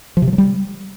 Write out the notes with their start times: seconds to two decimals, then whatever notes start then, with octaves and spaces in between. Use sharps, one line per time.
0.17 F3
0.22 C3
0.27 F3
0.33 F#3
0.38 G3